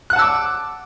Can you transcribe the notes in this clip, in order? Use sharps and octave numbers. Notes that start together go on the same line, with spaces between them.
F#5 A5 D6 E6 F#6